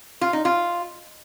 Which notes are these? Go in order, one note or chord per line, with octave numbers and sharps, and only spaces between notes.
F4
D#4
F4